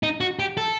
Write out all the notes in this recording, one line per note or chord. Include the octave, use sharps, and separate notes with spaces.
D#4
F#4
G4
A4